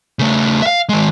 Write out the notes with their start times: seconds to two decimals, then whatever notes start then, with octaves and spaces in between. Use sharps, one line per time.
0.19 C#3 A3
0.62 E5 F5
0.89 D#3 G#3